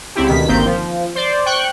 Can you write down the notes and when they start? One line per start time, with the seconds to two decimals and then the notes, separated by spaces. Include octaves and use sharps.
0.15 C#2 C4 E4 G4
0.27 D2 B2 D#3 B6
0.48 G1 D#3 A#3 C4 G6
0.66 F3
1.15 C5 D5
1.46 G5 C#6 F#6